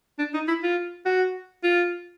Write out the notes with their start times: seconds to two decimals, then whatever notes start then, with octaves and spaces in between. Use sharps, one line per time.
0.19 D4
0.34 D#4
0.48 E4
0.63 F4
1.06 F#4
1.64 F4